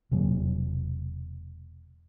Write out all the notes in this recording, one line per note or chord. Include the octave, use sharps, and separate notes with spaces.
E1 C3 F#3 A#3